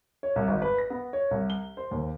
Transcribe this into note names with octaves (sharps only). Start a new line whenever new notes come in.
C#5
C2
G#1
B4
A#6
B3
C#5
C2
G7
C5
D#2